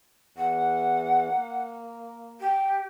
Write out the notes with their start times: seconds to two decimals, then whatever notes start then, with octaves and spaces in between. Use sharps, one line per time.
0.37 E2 F#5
1.31 A#3
2.40 G4